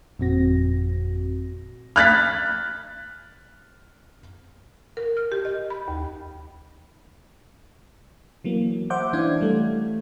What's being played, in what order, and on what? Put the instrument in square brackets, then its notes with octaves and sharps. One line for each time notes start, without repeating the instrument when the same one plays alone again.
[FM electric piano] G1 F2 A#2 C4 F#4 A#6
[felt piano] F6 F#6 A6 B6
[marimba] A#4
F6
G4
D#5
B5
D#2
[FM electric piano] E3 F#3 A#3
C5 E5 F#5 D6 G6
E3 C#4 D4 E4 F5 G#6
G3 A3